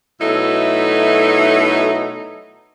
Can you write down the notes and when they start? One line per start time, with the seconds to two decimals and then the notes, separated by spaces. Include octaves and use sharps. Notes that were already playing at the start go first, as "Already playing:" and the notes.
0.20 B2 F#3 A3 D#4 E4 A4